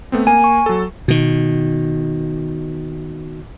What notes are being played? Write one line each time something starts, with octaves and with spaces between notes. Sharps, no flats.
A3 B3 C4
A#3 G#5
C#6
F#3 A4
B2 D#3